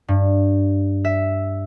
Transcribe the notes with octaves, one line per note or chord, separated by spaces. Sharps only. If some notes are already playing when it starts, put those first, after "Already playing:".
G2
E5